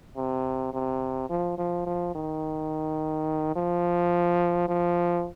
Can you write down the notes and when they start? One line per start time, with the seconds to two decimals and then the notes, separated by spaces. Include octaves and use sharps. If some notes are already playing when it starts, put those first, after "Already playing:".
0.17 C3
0.74 C3
1.30 F3
1.58 F3
1.86 F3
2.15 D#3
3.56 F3
4.69 F3